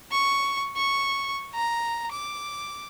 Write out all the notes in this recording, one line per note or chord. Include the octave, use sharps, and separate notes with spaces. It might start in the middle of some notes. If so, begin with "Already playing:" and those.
C#6
C#6
A#5
D6